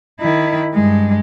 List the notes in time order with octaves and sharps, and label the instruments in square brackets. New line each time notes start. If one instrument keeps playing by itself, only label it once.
[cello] D#3 E4
G2 G#3